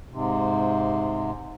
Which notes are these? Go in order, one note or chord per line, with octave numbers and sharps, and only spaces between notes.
G#2 C3